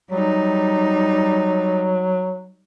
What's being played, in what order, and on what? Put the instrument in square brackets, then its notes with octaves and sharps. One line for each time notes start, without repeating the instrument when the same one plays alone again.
[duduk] F#3 [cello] G3 D#4